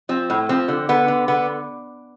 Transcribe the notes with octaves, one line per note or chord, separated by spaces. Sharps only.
F3 C4
A2
F3 C4
D3
D3 B3
D3
D3 B3